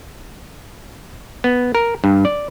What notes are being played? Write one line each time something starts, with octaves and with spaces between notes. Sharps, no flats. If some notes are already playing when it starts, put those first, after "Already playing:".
B3
A#4
G2
D5